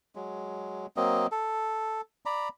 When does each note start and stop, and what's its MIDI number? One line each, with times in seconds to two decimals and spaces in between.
0.15 0.86 54
0.15 0.86 56
0.97 1.27 54
0.97 1.27 58
0.97 1.27 60
0.97 1.27 75
1.32 2.01 69
2.26 2.49 74
2.26 2.49 82
2.26 2.49 83